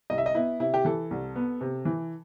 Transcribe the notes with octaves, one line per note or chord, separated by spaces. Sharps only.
C2 D#5
E5
D#5
B3 E4
C3 E4
G4
E3 A4
C2
B3
C3
E3